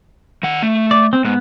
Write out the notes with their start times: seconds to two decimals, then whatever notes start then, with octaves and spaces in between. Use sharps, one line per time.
0.43 D#3 F#5
0.62 A3
0.91 D5
1.13 C4
1.25 G#2 B3